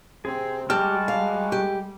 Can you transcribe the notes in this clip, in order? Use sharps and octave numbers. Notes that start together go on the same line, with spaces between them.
C3 C4 G#4
G3 G#3 F#4 G4 A5 F6
F5
G4